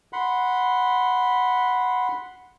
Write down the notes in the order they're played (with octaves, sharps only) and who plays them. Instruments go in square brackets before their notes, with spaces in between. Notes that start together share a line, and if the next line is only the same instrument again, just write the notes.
[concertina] F#5 B5 C6